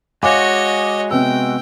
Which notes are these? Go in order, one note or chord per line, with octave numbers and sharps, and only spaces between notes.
G#3 F#4 C#5 D#5 F5 G#5 D6
C3 B3 G5 E6